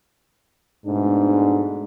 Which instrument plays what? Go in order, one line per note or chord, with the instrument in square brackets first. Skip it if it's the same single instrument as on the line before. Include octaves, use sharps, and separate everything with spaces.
[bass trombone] G#2 [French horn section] B2 A3 D4